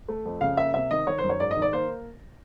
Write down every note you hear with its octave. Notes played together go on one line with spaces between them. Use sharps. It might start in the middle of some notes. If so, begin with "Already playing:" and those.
A3
F2
C#3 F5
A#3 E5
C3 E5
D#3 D#5
D#3 C#5
C5
F#2
C#5
G#2 D5
D#5
D#3
D5
A#3 C5